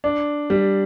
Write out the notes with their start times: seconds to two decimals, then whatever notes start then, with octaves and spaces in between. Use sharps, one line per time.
0.04 D4
0.50 G3